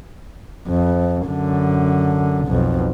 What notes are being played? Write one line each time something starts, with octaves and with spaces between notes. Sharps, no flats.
F2
F#2 D3
B1 F2